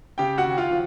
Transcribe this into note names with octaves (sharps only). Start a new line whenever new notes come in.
C#3 G4 G5
F#4 F#5
D#2
F4 F5
F3